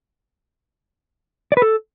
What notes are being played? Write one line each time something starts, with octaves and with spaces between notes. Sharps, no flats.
D5
B4
A4